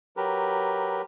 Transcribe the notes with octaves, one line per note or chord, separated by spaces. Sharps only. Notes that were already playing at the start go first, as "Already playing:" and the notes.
F#3 G4 A#4 B4